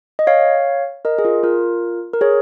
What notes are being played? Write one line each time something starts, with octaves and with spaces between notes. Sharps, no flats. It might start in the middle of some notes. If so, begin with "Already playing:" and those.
D#5
C#5 F5
A#4 D#5
G#4
F4 A#4
F4 A#4
A#4
G#4 C#5